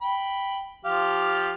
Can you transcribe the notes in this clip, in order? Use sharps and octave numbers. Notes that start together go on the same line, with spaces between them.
G5 B5
F3 G4 F5